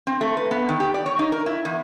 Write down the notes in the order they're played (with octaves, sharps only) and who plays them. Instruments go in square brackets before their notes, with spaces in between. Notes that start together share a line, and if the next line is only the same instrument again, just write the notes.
[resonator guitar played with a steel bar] C4
A3
B4
B3
D#3
G4
D5
C#5
D#4
A#4
E4
E2